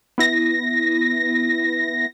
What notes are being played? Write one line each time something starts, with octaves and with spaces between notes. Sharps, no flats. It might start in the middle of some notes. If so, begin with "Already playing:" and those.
B3 E4 A#6